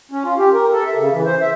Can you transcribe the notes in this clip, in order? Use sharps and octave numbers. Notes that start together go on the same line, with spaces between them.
C#4
F4
G4
A#4
A4
E5
C#3
E3
C5
E5